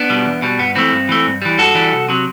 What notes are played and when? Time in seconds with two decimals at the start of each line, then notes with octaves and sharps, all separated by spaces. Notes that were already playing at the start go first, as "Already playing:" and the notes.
Already playing: B3 D4
0.09 B2 G3
0.26 E2
0.42 B2 G3
0.59 G2 B3
0.75 E3 A3 C4
0.93 G2
1.09 E3 A3
1.26 G2
1.42 E3 G3
1.58 G2 F#4 A4
1.75 E3 G3
1.92 C2
2.09 C3 F#3